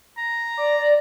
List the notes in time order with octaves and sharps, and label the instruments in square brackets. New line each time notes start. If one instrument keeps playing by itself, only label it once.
[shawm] A#5
[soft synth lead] D5